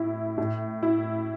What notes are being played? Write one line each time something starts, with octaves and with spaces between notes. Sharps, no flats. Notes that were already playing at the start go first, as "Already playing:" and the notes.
Already playing: A2 E4
A2
E4